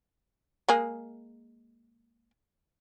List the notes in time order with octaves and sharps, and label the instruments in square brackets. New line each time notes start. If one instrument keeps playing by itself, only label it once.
[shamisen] G#3 A#3 G#4